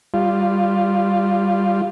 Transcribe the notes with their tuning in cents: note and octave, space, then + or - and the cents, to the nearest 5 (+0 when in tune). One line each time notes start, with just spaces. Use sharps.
G3 +0 F4 +0